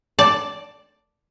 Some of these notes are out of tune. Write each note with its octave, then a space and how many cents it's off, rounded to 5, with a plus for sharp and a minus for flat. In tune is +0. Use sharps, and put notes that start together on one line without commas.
D5 +0 A5 +0